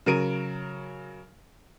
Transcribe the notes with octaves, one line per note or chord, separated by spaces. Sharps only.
C#3 F#3 A#4 D7 D#7